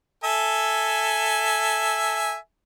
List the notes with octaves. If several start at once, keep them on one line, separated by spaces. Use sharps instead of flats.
A4 E5 G#5